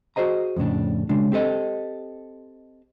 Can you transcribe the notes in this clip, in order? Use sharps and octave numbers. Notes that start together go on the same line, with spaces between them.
F#4 G#4 C5 D#5 A#5
F2 A2 C#3 D4
C#3 G#3 D4
C4 G4 A4 D#5